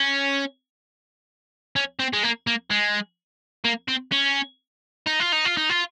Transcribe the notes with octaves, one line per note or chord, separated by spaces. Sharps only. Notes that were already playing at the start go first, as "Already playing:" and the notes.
Already playing: C#4
C#4
C4
G#3
A#3
A#3
G#3
A#3
C4
C#4
D#4
F4
D#4
F4
D#4
F4